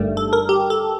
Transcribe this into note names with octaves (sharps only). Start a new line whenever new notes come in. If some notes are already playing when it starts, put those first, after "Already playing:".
Already playing: G1 G2 D#3 G3 A3
A4
A#4
G4
A4